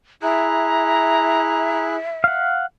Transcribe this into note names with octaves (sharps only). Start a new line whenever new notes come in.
E4 G#4 E5 A#5 F#6
F5 F#5